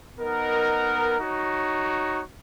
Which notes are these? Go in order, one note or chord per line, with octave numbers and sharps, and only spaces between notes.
B3 D#4 A#4 D#5 F#5
D#4 F#4 C#5